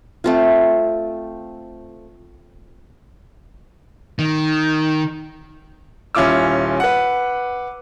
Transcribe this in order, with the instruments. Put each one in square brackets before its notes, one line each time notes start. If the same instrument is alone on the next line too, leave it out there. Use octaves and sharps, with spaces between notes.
[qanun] A3 C4 F4
[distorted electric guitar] D#3
[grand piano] D#1 C#4 E4 F4 D6 E6
B4 F#5